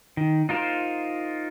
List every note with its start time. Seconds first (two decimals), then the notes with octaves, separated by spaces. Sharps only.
0.17 D#3
0.49 D#4 F4 A#4 C5